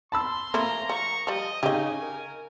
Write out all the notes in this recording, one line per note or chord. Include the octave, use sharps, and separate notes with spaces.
A5 B5 C6 E6
F3 A3 A#3 E4 A#5
F3 C#6
F3 G3 D#5
C#3 C#4 D#4 G4 D#5 G#5
A#4